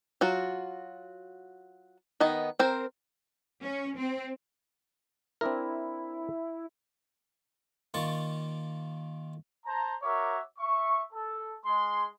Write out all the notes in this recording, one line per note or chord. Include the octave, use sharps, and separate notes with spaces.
F#3 F4 F#4
D#3 B3 D#5
C4 A#4 C5
C#4
C4
C4 D4 E4 A#4
D#3 A#3 F4 D5 C#6
C5 A5 A#5
F#4 A#4 C#5 E5 D6
E5 C#6
A4
G#3 C6